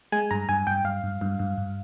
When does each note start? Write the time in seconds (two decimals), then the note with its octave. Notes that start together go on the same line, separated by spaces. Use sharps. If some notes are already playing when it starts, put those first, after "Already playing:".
0.12 G#3 G#5
0.31 G2 A#5
0.49 G2 G#5
0.67 G2 G5
0.84 G2 F5
1.04 G2
1.21 G2
1.39 G2
1.58 G2